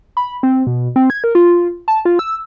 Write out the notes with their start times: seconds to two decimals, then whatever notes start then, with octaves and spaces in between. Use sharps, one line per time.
0.17 B5
0.43 C4
0.67 B2
0.96 C4
1.10 G#6
1.24 A#4
1.35 F4
1.88 A5
2.05 F4
2.19 E6